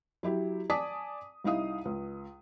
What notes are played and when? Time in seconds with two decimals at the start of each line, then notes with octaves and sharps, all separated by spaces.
0.23 F#3 E4 G4
0.70 D5 G#5 A5 D6 D#6 B6
1.44 C2 D#4 E4 F5 D#6
1.85 C#2